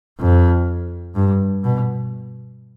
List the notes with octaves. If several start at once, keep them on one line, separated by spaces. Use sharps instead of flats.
F2
G2
B2